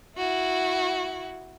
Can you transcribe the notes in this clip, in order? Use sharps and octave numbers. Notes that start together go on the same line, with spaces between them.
E4 F#4